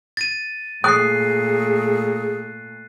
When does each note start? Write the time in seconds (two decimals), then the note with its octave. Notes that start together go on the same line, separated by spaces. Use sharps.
0.17 A6 D#7
0.84 A#2 A3 G#4 D#6 F#6 C7